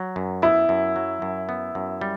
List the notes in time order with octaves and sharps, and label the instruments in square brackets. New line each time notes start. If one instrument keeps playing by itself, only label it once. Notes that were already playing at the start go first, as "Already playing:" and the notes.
Already playing: [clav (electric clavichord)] F#3
F#2
[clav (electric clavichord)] B3 [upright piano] E4
[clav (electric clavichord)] F#2
F#3
F#2
B3
F#2
G3